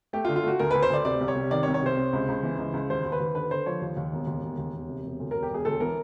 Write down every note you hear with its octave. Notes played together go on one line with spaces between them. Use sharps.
A3 G4
F4
D3
F4
A3 F#4
D2 A#4
D2 B4
C5
D2 D5
C3 D5
C2
C#5
C3
D#3 D5
C#5
C2
C#5
C3 C5
C3
C#2
C#2
E3
C#2
C#2
D#2 C5
D#2
B4
D#2
D3 B4
D3 C5
F3 C#5
D#2
D#2
E1
D#2
E1
D#2
E1
C3
E1
D2
E1 A#4
G4
E1 G#4
D2 A4
E3 A#4